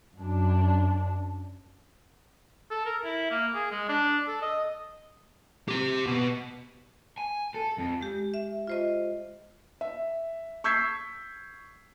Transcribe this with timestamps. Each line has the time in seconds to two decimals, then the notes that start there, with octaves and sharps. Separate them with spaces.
0.15 F#2 D4
2.71 A4
2.86 A#4
3.04 E4
3.31 A#3
3.54 G#4
3.71 G#3
3.89 D4
4.27 A4
4.42 D#5
5.68 G4 C6
6.06 B2
7.18 G#5
7.54 A4
7.78 F2
8.01 G#3 G4
8.34 E5
8.67 F4 C5 D#5
9.81 E5
10.64 C#6 E6 G6 G#6 B6 C7